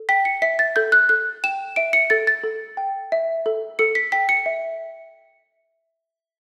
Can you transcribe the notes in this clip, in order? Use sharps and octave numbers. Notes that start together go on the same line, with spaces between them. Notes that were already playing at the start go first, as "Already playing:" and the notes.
Already playing: A4
G5 B6
C#7
E5 B6
A6
A4 G6
F#6
A4 F#6
G5 E7
E5 D7
C#7
A4 A6
A6
A4
G5
E5
A4
A4 C#7
B6
G5 B6
C#7
E5